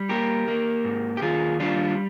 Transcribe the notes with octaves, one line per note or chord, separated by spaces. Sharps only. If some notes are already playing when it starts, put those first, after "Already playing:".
Already playing: G3
A#3 G4 A#4
A#3
G#2
G4
D#2 F4 G#4
G3 D4 F4